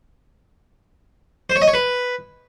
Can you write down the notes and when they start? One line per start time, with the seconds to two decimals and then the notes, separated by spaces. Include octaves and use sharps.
1.50 C5
1.56 C#5
1.62 D#5
1.68 C#5
1.74 B4